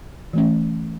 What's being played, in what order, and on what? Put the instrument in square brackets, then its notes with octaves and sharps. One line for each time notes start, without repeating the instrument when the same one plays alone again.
[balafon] E3 A3 C#4